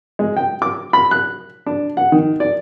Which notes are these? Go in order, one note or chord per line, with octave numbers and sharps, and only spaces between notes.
G#3
G5
D6
B5
F#6
D4
F#5
D#3
D5